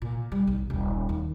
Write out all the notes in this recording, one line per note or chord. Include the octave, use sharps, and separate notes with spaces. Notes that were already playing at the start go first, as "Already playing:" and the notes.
A#2
G3
B1
D#1
D#2